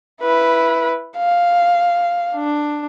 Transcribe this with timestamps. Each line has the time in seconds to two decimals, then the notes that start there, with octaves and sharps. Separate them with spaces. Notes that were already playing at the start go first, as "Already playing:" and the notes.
0.21 E4 B4
1.17 F5
2.35 D4